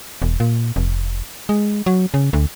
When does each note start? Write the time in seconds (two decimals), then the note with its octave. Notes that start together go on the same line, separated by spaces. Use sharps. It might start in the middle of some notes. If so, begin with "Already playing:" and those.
0.22 E1
0.40 A#2
0.76 F1
1.49 G#3
1.86 F#3
2.14 C#3
2.33 D2